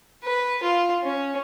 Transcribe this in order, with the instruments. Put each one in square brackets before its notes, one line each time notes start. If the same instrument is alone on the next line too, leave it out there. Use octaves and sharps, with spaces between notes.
[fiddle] B4
F4
C#4